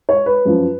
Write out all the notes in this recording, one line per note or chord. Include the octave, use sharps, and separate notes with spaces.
C#5
B4
F#2 F3